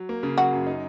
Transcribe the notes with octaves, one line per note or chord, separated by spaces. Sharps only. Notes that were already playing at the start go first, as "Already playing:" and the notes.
Already playing: F#3
A#3
C#3
F#3 F#4
F#2
D#4